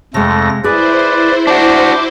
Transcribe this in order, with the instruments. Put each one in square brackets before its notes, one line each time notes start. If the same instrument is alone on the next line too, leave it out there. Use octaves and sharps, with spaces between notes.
[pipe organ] F2 A3 A#6 [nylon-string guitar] C3 G#3
[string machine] E4 C5 [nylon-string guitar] G#4 [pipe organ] B4 D5
[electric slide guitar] D4 F#4 [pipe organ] D6 G6